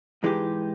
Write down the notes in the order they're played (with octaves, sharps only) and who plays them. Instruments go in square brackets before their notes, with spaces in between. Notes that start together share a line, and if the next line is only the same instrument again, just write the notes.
[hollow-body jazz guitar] G#2 E3 G#3 D#4 G4